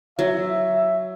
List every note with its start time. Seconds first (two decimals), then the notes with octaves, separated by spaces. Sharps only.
0.19 F#3 E5